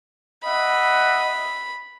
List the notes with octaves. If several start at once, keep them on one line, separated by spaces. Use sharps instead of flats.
D#5 E5 F#5 B5